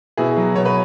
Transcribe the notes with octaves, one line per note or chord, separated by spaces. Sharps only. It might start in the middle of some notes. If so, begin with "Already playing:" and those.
B2 E4 G#4
F#3
B2 C#5
B4